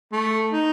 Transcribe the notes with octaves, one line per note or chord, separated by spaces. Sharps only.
A3
D#4